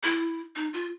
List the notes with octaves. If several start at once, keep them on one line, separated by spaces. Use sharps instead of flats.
E4
D#4
F4